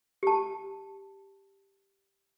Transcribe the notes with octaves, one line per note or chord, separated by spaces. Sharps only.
G4 A5